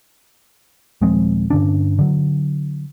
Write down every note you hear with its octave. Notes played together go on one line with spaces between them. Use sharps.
D#1 F3 G#3 C4
G2 D3 C#4 D4
D3 F#3